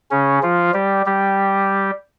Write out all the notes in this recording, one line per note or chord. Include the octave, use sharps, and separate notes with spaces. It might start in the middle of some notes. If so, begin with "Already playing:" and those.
C#3 C#4
F3 F4
G3 G4
G3 G4